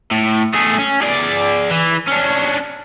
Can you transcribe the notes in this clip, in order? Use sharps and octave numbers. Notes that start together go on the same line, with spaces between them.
A2
A3 G#4
C#4
G#4 D5
E3
C#4 D4